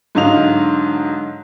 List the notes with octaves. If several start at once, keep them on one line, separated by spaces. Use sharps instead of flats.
G#2 D3 F#3 D#5 F5 F7